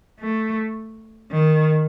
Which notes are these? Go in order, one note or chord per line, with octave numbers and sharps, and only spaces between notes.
A3
D#3